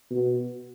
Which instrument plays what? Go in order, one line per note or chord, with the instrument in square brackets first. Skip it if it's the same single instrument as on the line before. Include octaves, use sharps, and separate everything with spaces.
[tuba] B2